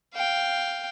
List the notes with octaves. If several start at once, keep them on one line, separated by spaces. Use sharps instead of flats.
F5 G5